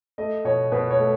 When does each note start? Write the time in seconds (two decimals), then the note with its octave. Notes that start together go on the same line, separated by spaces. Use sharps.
0.18 A3 D#5
0.45 B2 C#5
0.72 B2 B4
0.91 C#5
0.99 A3